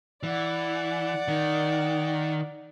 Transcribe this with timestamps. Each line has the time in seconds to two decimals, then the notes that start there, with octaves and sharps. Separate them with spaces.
0.23 E3 D5 F#5
1.28 D#3